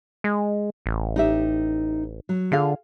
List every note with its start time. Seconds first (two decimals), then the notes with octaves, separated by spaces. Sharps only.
0.24 G#3
0.86 A1
1.16 D#4 G4 E5
2.29 F#3
2.52 D3 F4 G#4 F5